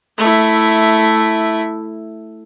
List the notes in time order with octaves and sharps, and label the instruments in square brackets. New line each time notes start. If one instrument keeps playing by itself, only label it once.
[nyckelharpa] A3 E4